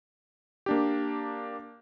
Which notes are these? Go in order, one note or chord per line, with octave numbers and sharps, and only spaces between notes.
A#3 D4 G4